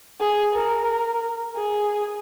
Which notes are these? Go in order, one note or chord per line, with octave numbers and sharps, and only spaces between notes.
G#4
A#4
G#4